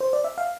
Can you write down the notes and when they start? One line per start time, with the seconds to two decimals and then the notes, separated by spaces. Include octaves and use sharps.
0.00 C5
0.13 D5
0.24 E5
0.38 F5